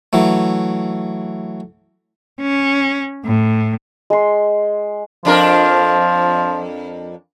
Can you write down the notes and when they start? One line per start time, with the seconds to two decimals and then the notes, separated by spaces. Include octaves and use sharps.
0.13 E3 F#3 A3
2.41 C#4
3.24 A2
4.10 G#3 C6
5.25 F2 F3 D4 A#4